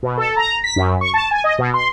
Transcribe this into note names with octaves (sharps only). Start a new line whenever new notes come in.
B2
A4
A#5
B6
F#2
C#6
A5
G#5
D#5
B2
C6